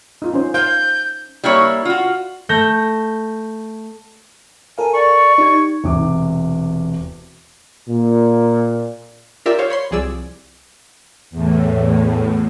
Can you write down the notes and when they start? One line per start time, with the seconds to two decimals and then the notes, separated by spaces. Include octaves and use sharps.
0.22 D#4 F4
0.34 C#4 C5
0.54 C5 F5 G6
1.44 G3 A#3 E4 C#5
1.85 F4 F#4
2.49 A3 G6 A#6
4.78 A4 A#4 F5 G#5
4.94 D5 C#6
5.38 D#4 G4 G#6
5.84 E1 C3 D6
7.89 A#2
9.46 F4 G4 A#4 D5 E5
9.59 C5 C#5 F5
9.70 C#5 B5 C6
9.91 C2 F3 G#4 D5 E6
11.31 E2 A2